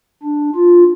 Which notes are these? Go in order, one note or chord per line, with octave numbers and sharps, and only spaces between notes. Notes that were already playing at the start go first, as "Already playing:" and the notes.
D4
F4